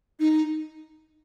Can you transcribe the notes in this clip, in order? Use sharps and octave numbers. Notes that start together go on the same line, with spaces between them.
D#4